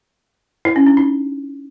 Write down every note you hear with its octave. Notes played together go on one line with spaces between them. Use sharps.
E4
C#4
D4
D#4